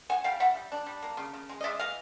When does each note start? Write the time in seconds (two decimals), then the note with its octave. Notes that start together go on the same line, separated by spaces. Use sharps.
0.09 F#3 F#5 G#5
0.24 G3 F5 G5
0.40 G3 E5 F#5
0.55 G3
0.72 D4
0.86 G3
1.02 A#3
1.17 C#3
1.33 C#3
1.49 G#3
1.61 D#5
1.64 G#3 D5 E5
1.79 E3 D#5 F5